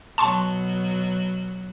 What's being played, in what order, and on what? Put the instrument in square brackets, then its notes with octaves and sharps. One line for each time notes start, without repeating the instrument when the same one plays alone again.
[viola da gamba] B2 F#3 [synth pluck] A5 C6 C#6